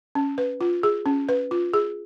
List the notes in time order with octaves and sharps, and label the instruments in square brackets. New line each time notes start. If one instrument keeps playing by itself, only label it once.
[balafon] C#4
B4
F4
G#4
C#4
B4
F4
G#4